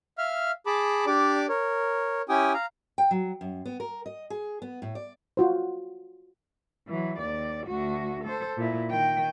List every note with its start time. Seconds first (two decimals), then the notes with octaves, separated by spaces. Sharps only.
0.18 E5 F5 F6
0.66 G#4 A5 B5 D6
1.06 D4 G4 D5 D6
1.49 A#4 C#5
2.29 C#4 E4 G4 G5 G#5 D#6
2.54 F5 A#5
2.98 G5
3.11 F#3
3.41 F#2
3.66 B3
3.80 A#4
4.06 D#5
4.30 G#4
4.62 B3
4.82 A2
4.95 D5
5.37 F4 F#4 C5
6.88 E3 F#3
7.19 D#2 D5
7.67 D2 F#4
8.24 A4 C5
8.58 A#2 E4
8.89 D#3 G5